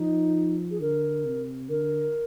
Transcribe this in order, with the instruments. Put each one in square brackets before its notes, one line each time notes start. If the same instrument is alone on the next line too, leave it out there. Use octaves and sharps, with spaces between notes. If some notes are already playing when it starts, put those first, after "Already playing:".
Already playing: [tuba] F3 [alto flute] D#4
[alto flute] G#4
[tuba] D3 [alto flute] A#4
[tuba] C3
[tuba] D3 [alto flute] A#4